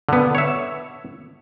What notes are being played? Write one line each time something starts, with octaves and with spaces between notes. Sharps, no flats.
D3 B3
C#5 E5